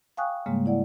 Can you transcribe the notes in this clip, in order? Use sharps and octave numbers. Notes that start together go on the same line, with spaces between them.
F5 G5 G#5 C#6 D#6 F#6
G#2 C#3 G3 G#3 A#3
E4 D5 F#5